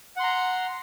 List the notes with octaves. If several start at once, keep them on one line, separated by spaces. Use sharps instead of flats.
F#5 A#5 C6